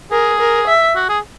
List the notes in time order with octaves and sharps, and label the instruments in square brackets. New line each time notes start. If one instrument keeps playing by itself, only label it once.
[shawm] G#4 [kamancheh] A#4
[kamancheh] A#4
E5
[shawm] F#4
G#4